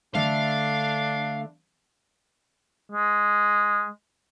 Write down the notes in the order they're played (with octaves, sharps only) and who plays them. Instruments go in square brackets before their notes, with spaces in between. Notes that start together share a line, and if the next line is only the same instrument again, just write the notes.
[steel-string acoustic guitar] D3 A3 [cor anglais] D4 [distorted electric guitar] F5
[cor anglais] G#3